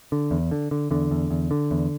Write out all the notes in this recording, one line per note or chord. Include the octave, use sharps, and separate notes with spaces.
D3
E2
D3
D3
E2 D3
E2
E2
D3
E2